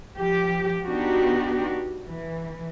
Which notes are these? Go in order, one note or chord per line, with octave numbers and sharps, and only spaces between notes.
F3 G4
B3 D4 D#4 F#4 G4
E3